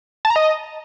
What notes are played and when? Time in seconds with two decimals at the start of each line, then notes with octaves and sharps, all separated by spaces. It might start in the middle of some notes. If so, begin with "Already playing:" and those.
0.25 A5
0.30 A#5
0.36 D#5